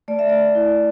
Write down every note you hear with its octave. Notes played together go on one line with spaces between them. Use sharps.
A3 D5
E5
D5
E4